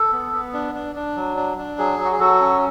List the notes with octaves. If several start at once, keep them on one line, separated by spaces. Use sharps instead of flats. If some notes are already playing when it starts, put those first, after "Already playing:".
Already playing: A4
B3
B3
D4
D4
D4
F#3
D4
D4
F#3 G#4
F#3
F#4
G#4
F#3 F#4 A4
C#4